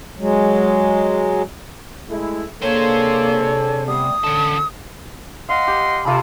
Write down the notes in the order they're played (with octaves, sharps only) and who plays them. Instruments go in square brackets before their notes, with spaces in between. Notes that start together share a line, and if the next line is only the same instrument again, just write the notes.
[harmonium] F#3 G#3
[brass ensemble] G#3 A3 E4
[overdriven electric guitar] C3 C5 [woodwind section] A#3 [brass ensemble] D4 G#4 A4 [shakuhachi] C#5
[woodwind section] G3 A3 B3 [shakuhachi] D#6
[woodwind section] D3 [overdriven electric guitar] C#4 A4
[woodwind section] D#5 F#5 C6 [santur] F5
[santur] G4
[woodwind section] C3 [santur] F4 A4 B5